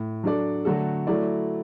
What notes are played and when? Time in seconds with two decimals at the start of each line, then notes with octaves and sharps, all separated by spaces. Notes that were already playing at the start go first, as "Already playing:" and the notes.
Already playing: A2
0.24 F#3 D4 A4 D5
0.65 D3 F#3 A3 F#4 A4
1.07 F#3 A3 E4 D5